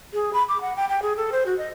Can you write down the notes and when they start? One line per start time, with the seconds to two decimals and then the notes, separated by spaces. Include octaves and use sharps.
0.13 G#4
0.33 B5
0.48 D6
0.61 F#5
0.76 G5
0.89 G5
1.02 G#4
1.17 A4
1.32 C5
1.46 F#4
1.58 D#5